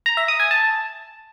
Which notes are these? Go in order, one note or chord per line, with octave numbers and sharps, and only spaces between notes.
A#5
E5
D#6
G#5
A5